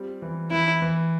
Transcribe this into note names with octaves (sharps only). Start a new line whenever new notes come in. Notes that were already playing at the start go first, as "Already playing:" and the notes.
Already playing: G3 C4 F4
E3
E3 E4
E3